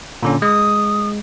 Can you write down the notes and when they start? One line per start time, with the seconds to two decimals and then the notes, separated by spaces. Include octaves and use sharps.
0.23 A#2 D3 C#4
0.42 G#3 D#6